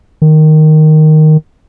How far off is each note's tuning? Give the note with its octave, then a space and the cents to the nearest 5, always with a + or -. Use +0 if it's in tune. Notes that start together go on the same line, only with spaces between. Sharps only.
D#3 -5